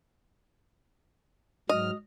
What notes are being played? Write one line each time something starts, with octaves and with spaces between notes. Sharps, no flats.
G#2 F#3 D#5 F6